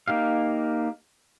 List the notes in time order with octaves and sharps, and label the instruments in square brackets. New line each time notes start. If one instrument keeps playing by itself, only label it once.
[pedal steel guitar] A#3 D#4 G4 F5